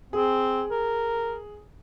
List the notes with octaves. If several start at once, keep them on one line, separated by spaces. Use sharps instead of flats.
C4 G#4
A#4